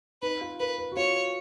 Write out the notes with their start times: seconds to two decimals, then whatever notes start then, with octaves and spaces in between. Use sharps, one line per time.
0.22 D#4 B4
0.41 F4
0.59 A#4 B4
0.78 B4
0.92 F#4
0.97 F4 C#5